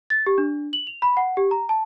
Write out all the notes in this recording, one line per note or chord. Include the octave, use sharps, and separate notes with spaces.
A6
G4
D4
F#7
F7
B5
F#5
G4
A#5
A5